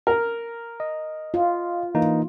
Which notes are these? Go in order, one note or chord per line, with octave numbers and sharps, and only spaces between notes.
A#4
D#5
F4
E3 A#3 D#4